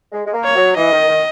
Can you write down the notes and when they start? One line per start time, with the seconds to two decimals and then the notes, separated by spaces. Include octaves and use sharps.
0.12 G#3
0.25 G#3
0.33 A#3
0.44 C#5
0.55 F#3
0.76 E3 D#5
0.92 D#3
1.08 D#3